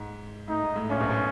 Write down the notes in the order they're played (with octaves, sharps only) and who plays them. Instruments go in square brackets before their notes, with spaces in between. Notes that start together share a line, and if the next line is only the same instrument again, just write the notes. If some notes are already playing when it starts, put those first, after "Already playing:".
Already playing: [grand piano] G#2
[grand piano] A2 [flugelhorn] D#4
[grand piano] G#2
A2
[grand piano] A#1 A#2 [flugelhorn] C#4
[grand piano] B1 B2
B2